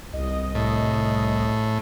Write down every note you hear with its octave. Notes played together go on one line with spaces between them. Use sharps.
C2 D#5
A2